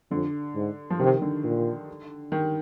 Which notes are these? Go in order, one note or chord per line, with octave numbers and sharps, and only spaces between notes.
F2 D3
G#2
F3
C3 D#3
D3
A#2
D#3